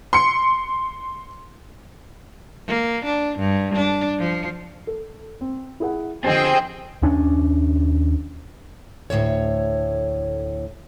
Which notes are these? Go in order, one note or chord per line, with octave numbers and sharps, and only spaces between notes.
C6 C#7
A#3
D4
G2
D4
F3
A4
C4
E4 G#4 F#5
D3 F3 C4 G4 G#4 D#5 G5
D#2 C#4 D4
D2 A2 E3 C#5